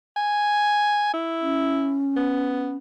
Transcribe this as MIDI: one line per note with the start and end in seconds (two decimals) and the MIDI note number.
0.16 1.10 80
1.13 2.01 64
1.41 2.76 61
2.16 2.77 59